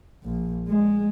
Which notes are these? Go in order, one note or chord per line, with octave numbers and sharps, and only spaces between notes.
A#1
G#3